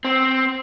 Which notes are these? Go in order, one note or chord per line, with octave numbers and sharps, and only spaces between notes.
C4